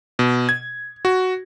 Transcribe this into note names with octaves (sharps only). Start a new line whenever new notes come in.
B2
G#6
F#4